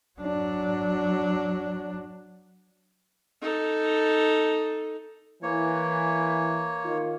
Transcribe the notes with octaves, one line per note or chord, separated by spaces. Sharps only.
F#3 D4
D#4 A4
E3 A#3 C#5
D#3 F4